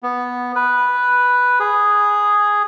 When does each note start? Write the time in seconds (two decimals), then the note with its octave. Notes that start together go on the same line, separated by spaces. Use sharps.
0.03 B3
0.56 B4
1.60 G#4